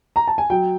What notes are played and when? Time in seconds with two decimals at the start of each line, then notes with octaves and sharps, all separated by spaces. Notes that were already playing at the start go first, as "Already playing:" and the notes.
0.16 A#5
0.27 A5
0.38 G#5
0.50 F#3 G5